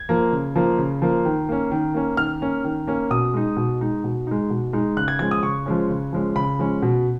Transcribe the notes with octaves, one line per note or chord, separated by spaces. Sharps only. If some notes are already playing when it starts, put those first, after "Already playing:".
Already playing: G#6
F3 A#3
C#3
F3 A#3
C#3
F3 A#3
D#3
A#3 C#4
D#3
A#3 C#4
D#3 F6
A#3 C#4
D#3
A#3 C#4
B2 D#6
G#3 D#4
B2
G#3 D#4
B2
G#3 D#4
B2
G#3 D#4
C#3 F#6
G#6
F3 G#3 C#4 G#6
D#6
C#3 C#6
F3 G#3 C#4
C#3
F3 G#3 C#4
C#3 B5
F3 G#3 C#4
B2